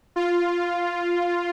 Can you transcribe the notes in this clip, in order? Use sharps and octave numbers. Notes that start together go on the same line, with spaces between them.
F4